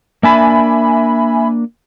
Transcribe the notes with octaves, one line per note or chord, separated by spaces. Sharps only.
A#3 D4 E5 G#5 A5 B5